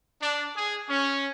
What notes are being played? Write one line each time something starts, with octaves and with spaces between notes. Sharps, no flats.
D4
G#4
C#4